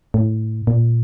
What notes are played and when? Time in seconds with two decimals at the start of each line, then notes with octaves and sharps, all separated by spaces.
0.14 A2
0.67 A#2